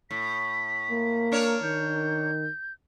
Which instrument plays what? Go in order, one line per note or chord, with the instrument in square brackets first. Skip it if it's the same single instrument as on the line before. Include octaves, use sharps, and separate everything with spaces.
[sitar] A2 [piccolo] B6
[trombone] A#3
[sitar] D4 A#4 C#5
[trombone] D#3 [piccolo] G6